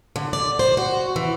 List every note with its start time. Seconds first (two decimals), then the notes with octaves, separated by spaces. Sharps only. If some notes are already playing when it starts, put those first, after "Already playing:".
0.16 D3
0.33 D5
0.59 C5
0.77 F#4
1.16 E3